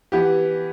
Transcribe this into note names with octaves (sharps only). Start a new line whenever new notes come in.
E3 B3 G4